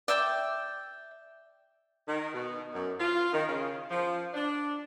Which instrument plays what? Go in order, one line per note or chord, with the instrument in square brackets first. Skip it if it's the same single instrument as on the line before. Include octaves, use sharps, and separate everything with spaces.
[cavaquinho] D5 E5 G5 D6
[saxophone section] D#3
B2
F#2
F4
D#3
C#3
F3
D4